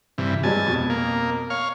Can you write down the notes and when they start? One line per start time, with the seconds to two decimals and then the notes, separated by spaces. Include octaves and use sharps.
0.18 G2 C3 E3
0.43 G2 F#3 G#3 G#5 A5
0.66 F2 B2
0.90 A#3
1.50 C#5 F5